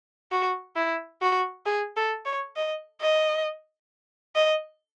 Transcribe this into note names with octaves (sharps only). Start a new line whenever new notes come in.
F#4
E4
F#4
G#4
A4
C#5
D#5
D#5
D#5